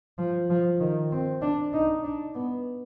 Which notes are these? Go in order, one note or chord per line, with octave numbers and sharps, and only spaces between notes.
F3
F3
D#3
C4
D4
D#4
D4
B3